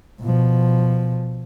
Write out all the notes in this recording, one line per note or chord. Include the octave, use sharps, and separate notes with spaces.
B2 F3